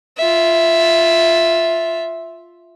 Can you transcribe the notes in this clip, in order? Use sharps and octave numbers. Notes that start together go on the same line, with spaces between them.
F4 E5